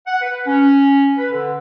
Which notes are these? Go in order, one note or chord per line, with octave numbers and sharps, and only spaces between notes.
F#5
B4
C#4
B4
D3